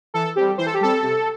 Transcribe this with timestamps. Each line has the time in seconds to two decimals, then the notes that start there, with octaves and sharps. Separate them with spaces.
0.14 E3 A4
0.36 G3 C4 G4
0.58 E3 C5
0.66 A4
0.74 G4
0.81 G3 C4 A4
1.03 C3